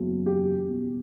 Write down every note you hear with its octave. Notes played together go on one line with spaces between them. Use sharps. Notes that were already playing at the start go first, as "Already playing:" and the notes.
Already playing: F#1 E2 C#3 F#3
G4
E2 B2 G3